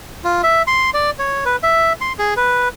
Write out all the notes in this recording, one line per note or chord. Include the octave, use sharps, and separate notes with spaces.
F4
E5
C6
D5
C#5
B4
E5
C6
G#4
B4